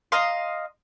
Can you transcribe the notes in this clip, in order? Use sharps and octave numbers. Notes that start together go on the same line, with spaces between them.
D#5 F5 A#5 C6